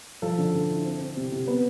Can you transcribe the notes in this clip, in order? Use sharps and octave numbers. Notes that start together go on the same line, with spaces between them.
F3 A4
D3
D3
E4
C4
C4
C3
C3
B3